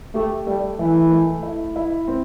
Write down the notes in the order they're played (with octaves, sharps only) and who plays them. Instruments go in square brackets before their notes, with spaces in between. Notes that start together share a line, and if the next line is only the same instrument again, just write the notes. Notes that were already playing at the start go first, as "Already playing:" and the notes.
[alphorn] A3 [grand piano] G4
[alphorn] G3 [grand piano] A3
[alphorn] E3 [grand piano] A3
[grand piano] A3
E4
E4
C4